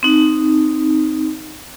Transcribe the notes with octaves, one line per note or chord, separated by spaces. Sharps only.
C4 D#4